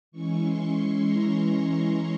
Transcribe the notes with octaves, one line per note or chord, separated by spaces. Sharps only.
E3 G#3 C#4 E4 C#6
C6
C6
A#5
C6